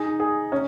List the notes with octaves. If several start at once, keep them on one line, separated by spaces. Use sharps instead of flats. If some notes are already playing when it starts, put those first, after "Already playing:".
Already playing: D#4 G#4
G#4
C#4